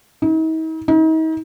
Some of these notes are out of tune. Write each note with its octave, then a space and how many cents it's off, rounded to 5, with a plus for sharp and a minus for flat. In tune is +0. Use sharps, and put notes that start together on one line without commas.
D#4 +45
D#4 +40